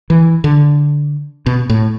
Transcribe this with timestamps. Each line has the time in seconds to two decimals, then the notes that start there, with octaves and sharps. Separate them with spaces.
0.10 E3
0.44 D3
1.46 B2
1.70 A2